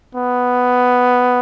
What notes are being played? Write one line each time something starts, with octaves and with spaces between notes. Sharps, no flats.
B3